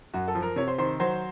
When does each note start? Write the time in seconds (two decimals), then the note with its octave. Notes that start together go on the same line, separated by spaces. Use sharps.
0.14 F#2 F#4
0.28 A4
0.35 F3
0.42 A#4
0.56 C3 C#5
0.68 C5
0.78 D#3 C5
1.00 F#3 C5